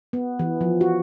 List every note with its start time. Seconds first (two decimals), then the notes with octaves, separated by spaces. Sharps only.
0.13 B3
0.39 E3
0.61 F3
0.81 F#4